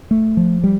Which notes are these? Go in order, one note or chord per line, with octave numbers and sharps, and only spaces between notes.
A3
F3
G3